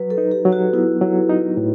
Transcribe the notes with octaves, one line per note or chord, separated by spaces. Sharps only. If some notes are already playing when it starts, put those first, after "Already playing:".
Already playing: F#3 B4
A4
D#4
G4
F#3
F#4
B3 E4
F#3
D#4
A2